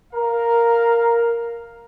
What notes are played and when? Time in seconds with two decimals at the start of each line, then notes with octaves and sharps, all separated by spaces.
0.13 A#4 F5